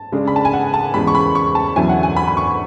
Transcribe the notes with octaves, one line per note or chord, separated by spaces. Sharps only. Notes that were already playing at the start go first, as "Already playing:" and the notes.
Already playing: A5
C#3 G#3 D4
B5
A5
G#5
F#5
A5
E2 C#3 G#3 B5
C#6
B5
C#6
A5
E2 D3 F#3 C#4 E4 G#5
F#5
G#5
B5
B5
C#6